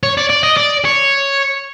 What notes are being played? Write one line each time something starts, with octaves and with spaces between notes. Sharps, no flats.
C#5
D5
D5
D#5
D5
C#5